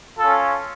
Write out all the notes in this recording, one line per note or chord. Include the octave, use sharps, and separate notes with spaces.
C#4 F4 A4